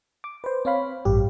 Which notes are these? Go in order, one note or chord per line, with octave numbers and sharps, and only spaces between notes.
D6
B4 C5
C4 C#5 F5 B5
A1 G2 G4